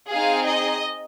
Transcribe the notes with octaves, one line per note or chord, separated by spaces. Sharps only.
C4 D#4 G#4 F5
D#5